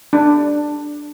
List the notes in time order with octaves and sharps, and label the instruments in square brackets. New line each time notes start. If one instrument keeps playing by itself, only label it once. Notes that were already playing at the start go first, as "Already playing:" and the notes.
[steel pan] D4